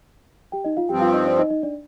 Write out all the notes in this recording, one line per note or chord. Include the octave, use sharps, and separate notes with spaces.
G4 G5
D#4 D#5
F4 F5
G2 F3 C4 G4 G5
F4 F5
D#4 D#5
D4 D5
D#4 D#5
D#4 D#5
D4 D5